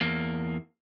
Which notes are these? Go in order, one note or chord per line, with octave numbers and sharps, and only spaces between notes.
E2 A#3